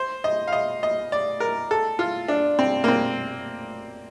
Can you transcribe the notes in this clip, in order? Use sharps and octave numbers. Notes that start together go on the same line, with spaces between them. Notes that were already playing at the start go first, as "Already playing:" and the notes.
Already playing: C5
D#5
F5
D#5
D#5
D5
A#4
A4
F4
D4
C4
A#3
C4